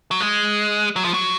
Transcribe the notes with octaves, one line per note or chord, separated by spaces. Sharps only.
F#3
G#3
F#3
F3
F#3